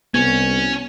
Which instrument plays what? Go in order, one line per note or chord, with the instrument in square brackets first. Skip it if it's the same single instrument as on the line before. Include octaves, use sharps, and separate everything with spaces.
[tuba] C2 [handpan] B3 [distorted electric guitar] C#4 [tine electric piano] G#6